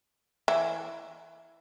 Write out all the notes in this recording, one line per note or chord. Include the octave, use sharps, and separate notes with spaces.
E3 E4